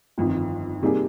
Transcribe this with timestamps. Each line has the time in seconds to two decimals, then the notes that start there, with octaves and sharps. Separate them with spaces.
0.18 G1 F2 D#3
0.82 C3 G3 A#3 D#4 G#4